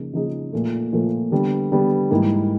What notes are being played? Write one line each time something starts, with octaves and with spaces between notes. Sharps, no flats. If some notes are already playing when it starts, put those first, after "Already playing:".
Already playing: C#3 F3 A#3 D#4 G#4
C#3 F3 A#3 D#4 G#4
A#2 F3 A3
A#2 F3 A3
D3 G3 B3
D3 G3 B3
G#2 E3 G3 A#3